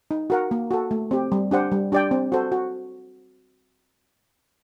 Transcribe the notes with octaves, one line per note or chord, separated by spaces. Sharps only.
D#4
F#4 A#4 F#5
A#3
F#4 A4
A3
C4 G4
G3
D4 G4 C5 F#5
G3
D4 G4 D5 G5
C4
F#4 A4 C5
F#4